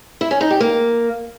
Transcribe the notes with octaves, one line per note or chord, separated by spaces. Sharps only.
E4
C#4
D#4
G4
A#3